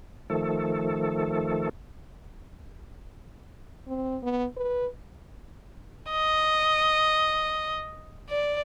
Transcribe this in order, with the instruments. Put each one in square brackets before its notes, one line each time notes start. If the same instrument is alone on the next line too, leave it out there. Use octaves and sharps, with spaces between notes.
[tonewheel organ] D#3 F3 A3 A4
[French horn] C4
B3
B4
[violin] D#5
D5